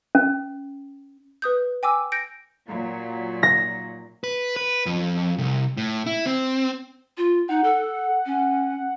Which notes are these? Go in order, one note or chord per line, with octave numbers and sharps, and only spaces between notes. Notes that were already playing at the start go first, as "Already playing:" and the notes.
C#4
B4 D#6 G6
G5 G#5 D6 E6
G6 A#6 C#7 D7
A#2 F#3
A#6
B4
B4
F2
C2
A2
E4
C4
F4
D#4 F#5
A4
C#4